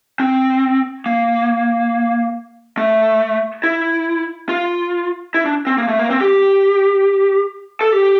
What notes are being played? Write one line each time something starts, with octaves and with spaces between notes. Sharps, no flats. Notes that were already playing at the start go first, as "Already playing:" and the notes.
C4
A#3
A3
E4
F4
E4
D4
C4
A#3
A3
A#3
C4
G4
A4
G4